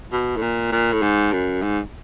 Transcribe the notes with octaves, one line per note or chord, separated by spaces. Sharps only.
B2
A2
A#2
A#2
A2
G#2
F#2
G#2